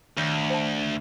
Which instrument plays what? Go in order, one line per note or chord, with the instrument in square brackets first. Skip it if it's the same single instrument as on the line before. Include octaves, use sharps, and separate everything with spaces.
[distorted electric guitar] D2 [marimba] D#3 G6
[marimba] C5 A5